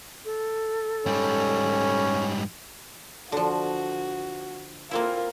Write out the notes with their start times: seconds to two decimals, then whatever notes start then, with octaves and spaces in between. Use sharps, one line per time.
0.24 A4
1.06 G#2 G3 C#4
3.32 D3 F3 F#4
4.91 A#3 C4 E4 F4 A#4